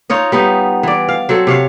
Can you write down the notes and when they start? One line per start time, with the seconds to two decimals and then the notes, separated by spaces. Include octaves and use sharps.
0.10 D#4 F4 C#5 D#5
0.32 G3 B3 D#4
0.83 E3 D5
1.09 F5
1.29 F#3 C4 A4
1.47 C3 C#5 F5